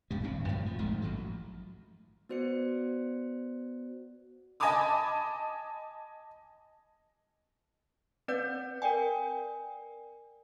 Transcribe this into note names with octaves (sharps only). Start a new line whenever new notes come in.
A#1 G2 G3
D#1 G2 C4
F#2 A2 F3 F#3
F3
G#1 G#2 D#3 A3
A1 F3 F#3
B3 F#4 C5 D5 C#7
D#5 G#5 A5 B5 D6 D#6
C4 B4 D5 F#5 G6
A#4 D5 G5 G#5